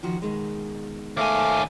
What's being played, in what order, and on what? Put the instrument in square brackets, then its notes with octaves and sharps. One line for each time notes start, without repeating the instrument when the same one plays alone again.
[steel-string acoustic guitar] D#3 F3 F#4
B2 D#3 G#3
[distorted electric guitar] D#2 G#5 [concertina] A3 F5 D6